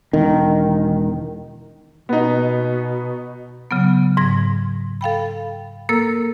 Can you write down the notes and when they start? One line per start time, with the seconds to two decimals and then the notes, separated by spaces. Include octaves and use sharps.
0.13 E1 D#3
2.09 B2 B3 D#4
3.71 C#3 F#3 B3
4.17 G#2 G#6 A#6
5.01 A4 F5 G5 B5
5.89 A#3 A4 A#4 E6